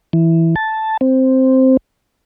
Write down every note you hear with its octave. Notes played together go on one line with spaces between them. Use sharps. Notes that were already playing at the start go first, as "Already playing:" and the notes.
E3
A5
C4